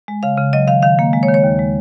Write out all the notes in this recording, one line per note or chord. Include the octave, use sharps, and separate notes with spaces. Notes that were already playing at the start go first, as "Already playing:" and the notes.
G#3
C#3 F5
C#3
F#3 D#5
D#3 F5
D#3 F5
A#3
G#3
C#5
D#3
C#5
D#2
G#3